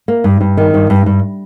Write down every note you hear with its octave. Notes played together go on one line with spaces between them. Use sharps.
A#3
G2
G2
D#3
G2
G2
G2